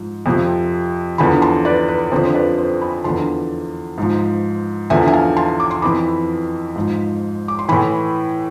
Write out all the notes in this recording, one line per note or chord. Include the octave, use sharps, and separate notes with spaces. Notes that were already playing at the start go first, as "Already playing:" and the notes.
Already playing: G#2 F3
F2 C3 F3
E2 D3 F3 G#5 B5
A5 C6
B4 D5
B4
F2 D3 F3 C5
C5
B4 D5
C5
G#5 B5
E2 D3 F3 A5 C6
G#2 F3
E2 D3 F3 E5 G#5
G#5
F5 A5
A5 C6
D6
C6
F2 E3 B5 D6
G#2 F3
D6
C6
A2 E3 G#5 B5